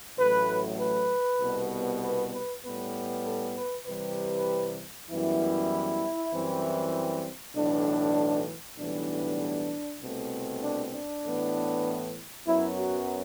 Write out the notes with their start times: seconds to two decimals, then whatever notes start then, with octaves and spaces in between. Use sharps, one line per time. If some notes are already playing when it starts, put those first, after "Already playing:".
0.18 A1 A2 F#3 A3 B4
0.79 B4
1.40 C2 B2 G3 B3
2.02 B4
2.33 B4
2.63 A2 G3 B3 B4
3.25 A4
3.56 B4
3.86 C2 C3 E3 G3 B4
5.09 F#2 E3 G3 B3 E4
6.32 F#2 E3 G3 C4
7.55 B1 A2 E3 D4
8.77 B1 A2 E3 G3 B3 D4
10.01 C2 B2 A3 C4
10.61 D4
10.92 D4
11.23 A2 E3 B3
12.45 F#2 F#3 B3 E4
12.77 F#4